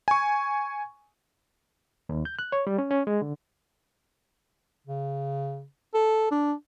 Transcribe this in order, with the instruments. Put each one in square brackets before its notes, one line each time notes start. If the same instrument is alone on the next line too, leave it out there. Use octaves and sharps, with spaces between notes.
[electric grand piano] G#5 C#6
[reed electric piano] D#2
G6
F#6
C#5
G3
C#4
C#4
G#3
D3
[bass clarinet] C#3
A4
D4